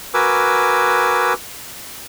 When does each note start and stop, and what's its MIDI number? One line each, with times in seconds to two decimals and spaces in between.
0.14 1.33 66
0.14 1.33 70
0.14 1.33 71
0.14 1.33 80
0.14 1.33 86
0.14 1.33 88